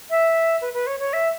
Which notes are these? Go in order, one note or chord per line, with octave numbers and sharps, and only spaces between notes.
E5
B4
B4
C#5
C#5
E5